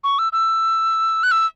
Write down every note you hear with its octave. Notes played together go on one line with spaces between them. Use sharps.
C#6
E6
E6
F#6
E6